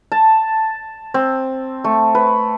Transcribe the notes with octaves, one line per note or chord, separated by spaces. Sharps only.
A5
C4
A3
B4